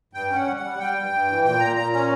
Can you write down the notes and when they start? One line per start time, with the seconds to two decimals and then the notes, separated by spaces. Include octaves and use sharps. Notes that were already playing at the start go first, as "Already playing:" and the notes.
0.13 G2 G5
0.30 C#4 F#5
0.46 G3
0.56 F#5
0.62 G3
0.79 G3 G5
0.96 G2
1.11 G2
1.28 E3
1.44 A#2 G5
1.60 A#2 A#5
1.76 A#2 A#5
1.92 C#4 A#5